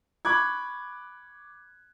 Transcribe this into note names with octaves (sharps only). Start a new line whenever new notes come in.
B5 C#6 D6 F#6 G#6